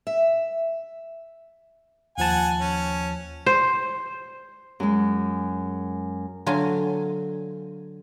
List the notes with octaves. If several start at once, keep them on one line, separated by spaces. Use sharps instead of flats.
E5
D#2 F3 F#5 G#5 A5
C#4
C5
F#2 G#3
D3 F#3 F4 G#5